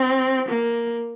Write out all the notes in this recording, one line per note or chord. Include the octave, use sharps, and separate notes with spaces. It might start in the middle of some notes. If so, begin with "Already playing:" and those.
Already playing: C4
A#3